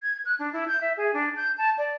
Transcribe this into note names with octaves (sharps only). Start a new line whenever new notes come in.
G#6
F#6
D4
E4
G6
E5
G#4
D4
G6
A5
D5